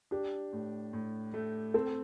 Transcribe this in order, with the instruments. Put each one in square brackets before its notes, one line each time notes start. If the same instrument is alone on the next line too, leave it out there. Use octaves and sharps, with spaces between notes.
[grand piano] D4 [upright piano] G4
[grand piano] A2
A2
A3
[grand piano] C4 [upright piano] A4